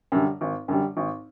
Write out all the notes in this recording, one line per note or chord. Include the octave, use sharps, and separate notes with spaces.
F#2 D3 G3
G#1
F#2 D3 G3
G#1